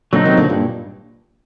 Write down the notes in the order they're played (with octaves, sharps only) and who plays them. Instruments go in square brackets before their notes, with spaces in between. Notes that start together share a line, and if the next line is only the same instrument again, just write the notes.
[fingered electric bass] A#2 D3 [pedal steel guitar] F#3 C4 D#4
[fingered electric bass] C3 D#3
A#2 D3
G2 A#2